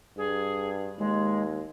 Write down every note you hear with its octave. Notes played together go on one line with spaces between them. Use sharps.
G2 G#4
D#2 G#3